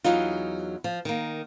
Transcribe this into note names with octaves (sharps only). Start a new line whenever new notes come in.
E2 F#3 D#4 F4
F3
D#3 A#3